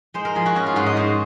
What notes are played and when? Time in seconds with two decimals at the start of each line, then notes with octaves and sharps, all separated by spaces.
0.14 G#3 C5
0.25 A#4
0.35 F3 G#4
0.46 F#4
0.56 C#4
0.67 F4
0.76 G#2 F#4
0.86 D#5
0.97 G#2 C5